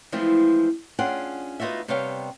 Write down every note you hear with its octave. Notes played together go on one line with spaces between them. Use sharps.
E3 F3 G#3 A3 C4 F4
C#4 D4 F4 G#4 F#5 G5
B3 D#4 F4 F#4 E5
C3 G3 B3 C#5 F5 G5